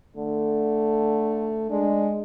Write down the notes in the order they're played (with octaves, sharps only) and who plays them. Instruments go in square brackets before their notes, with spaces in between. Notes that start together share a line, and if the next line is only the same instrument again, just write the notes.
[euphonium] D3 [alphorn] A3
[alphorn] G#3 [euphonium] D4